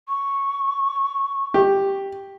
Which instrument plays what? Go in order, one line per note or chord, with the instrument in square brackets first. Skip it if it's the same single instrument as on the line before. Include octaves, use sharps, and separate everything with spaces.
[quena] C#6
[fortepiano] G4